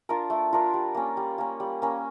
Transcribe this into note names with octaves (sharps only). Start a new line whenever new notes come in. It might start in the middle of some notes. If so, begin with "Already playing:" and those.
D4 F4 A#4
A3
D4 F4 A#4
G3
A#3 C#4
G3
A#3 C#4
G3
A#3 C#4